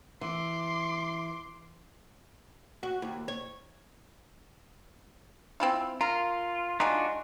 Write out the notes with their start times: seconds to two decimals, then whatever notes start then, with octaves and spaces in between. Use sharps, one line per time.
0.21 E3 C6 D6
2.83 F#4
3.02 D#2
3.28 C#5
5.60 C4 E4 F4
6.01 F4 A#4
6.80 G#3 D4 D#4 F4 F#4